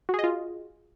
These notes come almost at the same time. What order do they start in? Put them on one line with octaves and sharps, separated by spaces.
F#4 G#4 D#5 F4